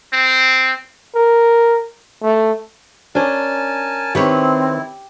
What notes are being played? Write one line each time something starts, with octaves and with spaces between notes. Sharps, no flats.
C4
A#4
A3
C#4 D4 A#4 G#5 A5
D#3 C4 E4 G4 B4 C#5